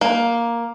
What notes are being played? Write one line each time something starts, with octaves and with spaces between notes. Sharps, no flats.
A#3